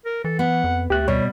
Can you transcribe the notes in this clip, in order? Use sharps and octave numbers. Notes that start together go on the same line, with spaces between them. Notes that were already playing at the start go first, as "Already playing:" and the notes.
A#4
E3 A4
B3 F#5
F2
D2 A3 G4 F#6
B2 G3 C#5